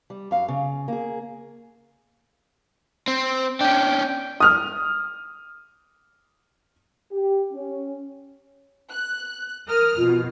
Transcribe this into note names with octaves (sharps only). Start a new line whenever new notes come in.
G3
F#2 F5
C#3
A#3 G#4
C4
C#4 D4 G5
D#6 F6
G4
C#4
F#6
A#4 D#6 F6
F2 B2 F4